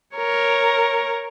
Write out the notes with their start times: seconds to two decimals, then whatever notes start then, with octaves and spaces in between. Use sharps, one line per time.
0.16 A#4 C#5